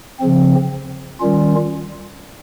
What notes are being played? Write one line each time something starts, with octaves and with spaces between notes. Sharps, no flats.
C#3 F3 C4
D#3 G3 C#4 F4